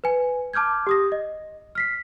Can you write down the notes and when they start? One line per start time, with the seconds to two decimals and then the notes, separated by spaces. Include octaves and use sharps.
0.04 B4 G#5
0.54 A5 D6 F6 G6 G#6
0.87 G4 D#6 A#6
1.12 D#5
1.75 F6 B6 C7